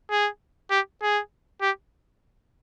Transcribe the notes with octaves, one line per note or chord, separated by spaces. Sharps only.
G#4
G4
G#4
G4